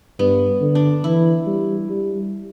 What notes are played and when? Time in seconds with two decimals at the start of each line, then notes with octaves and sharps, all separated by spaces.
0.19 G2 B3
0.61 D3
0.75 D4
1.04 E3 E4
1.46 G3
1.89 G3